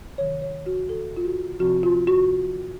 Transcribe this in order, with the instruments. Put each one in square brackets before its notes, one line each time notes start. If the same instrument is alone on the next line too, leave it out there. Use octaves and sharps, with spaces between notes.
[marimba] C3 D#3 F#3 C#5
C#5
F#4
A4
F4
F#4
C3 F3 C4 F4 F#4
F4
F#4